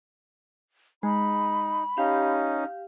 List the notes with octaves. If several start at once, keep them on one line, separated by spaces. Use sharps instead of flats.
G#3 D#4 B5
C#4 D#4 G4 F5